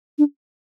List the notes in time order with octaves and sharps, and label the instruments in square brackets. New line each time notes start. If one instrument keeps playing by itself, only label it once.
[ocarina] D4